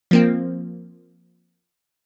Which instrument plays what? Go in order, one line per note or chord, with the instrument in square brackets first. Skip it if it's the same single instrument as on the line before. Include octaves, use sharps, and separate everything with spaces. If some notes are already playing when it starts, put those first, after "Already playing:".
[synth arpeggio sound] F3 A#3 C4